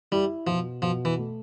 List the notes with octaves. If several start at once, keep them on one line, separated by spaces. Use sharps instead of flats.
G3 E4
B2 F3
B2 F3
E3
A3